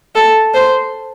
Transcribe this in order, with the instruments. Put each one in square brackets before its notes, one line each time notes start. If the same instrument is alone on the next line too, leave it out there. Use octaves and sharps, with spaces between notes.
[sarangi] A4
C5